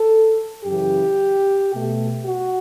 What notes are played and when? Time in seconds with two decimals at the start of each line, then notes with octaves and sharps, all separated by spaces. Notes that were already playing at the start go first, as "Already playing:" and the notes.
Already playing: A4
0.65 F#2 C#3 E3 G4
1.73 B2 A3
2.27 F#4